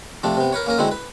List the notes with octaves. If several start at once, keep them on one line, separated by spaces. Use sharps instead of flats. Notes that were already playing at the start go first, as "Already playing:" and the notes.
C3 F3 A3 D4
C3 B3
A#4 B4 C#5
A#3 C#4 A#4
D3 G#3 C4 E4 F#4
B4